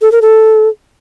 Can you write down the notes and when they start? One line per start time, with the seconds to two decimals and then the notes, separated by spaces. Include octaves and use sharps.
0.02 A4
0.12 A#4
0.22 A4